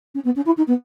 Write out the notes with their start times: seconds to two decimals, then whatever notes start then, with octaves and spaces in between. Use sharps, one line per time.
0.15 C#4
0.25 B3
0.36 C#4
0.46 E4
0.57 D#4
0.67 B3